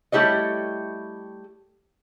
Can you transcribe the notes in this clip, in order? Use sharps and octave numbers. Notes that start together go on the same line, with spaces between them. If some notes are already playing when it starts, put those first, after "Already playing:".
G3 A3 E4 G4 C#5 D#5